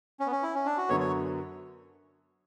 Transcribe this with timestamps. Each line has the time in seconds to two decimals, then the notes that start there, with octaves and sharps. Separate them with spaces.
0.20 C#4
0.26 B3
0.32 C#4
0.43 E4
0.55 C#4
0.66 D4
0.77 F#4
0.89 F#2 D3 F#3 B3 C#5
1.00 C#5